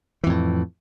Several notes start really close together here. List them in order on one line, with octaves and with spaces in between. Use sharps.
E3 F2 A2